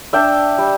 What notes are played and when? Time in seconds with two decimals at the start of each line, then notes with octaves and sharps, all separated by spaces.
0.13 D4 E5 G5
0.58 G3